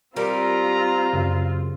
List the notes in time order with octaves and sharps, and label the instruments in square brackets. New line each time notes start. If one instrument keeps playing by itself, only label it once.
[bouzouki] G3 [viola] C4 F4 [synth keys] A#4 B6 D7 [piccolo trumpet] A#5
[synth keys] F#2 C#3